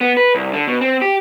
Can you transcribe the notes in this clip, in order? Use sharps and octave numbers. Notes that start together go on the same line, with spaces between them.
B3
B4
C2
D3
B2
C4
G4